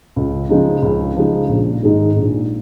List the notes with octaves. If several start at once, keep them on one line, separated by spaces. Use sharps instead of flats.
C#2
C#3 F3 G#3 D#4
C#2
C#3 F3 G#3 D#4
A#1
G#2 D#3 G#3 D#4
A#1